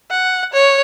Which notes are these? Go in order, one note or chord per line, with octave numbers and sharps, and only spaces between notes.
F#5
C#5